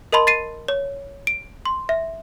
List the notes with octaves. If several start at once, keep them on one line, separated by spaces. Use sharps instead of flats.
A#4 D#5 A5 B5 C6
A6 C7 D#7
C#5
D7
C6
E5